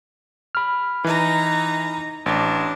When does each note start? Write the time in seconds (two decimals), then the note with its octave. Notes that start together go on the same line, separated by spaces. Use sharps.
0.55 B5 F6
1.04 E3 D#4 A#5
2.26 A1 D4